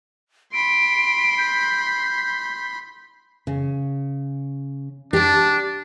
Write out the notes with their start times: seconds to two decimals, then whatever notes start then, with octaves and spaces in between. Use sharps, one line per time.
0.53 B5 C6 D7
1.38 G6
3.47 C#3
5.13 D4 G4 A5